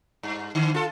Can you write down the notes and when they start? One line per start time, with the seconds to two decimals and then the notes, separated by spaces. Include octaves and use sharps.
0.23 G2
0.55 D3
0.74 F4 A4